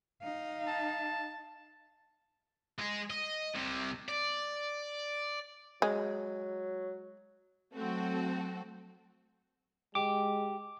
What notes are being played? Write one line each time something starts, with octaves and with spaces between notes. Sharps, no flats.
D#4 F5
A5
G#3 G#4
D#5
C2 C3
D5
F#3 G#3
F#3 A3 C4 F#4 A4
G#3 G4 D6